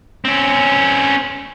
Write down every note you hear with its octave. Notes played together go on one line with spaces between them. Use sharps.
C4 C#4